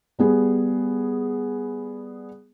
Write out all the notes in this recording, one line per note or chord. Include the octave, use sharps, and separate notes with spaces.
G3 B3 G#4